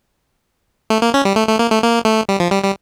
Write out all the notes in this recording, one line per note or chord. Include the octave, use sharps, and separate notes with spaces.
A3
A#3
C#4
G3
A3
A3
A#3
A3
A#3
A3
G3
F3
G3
G3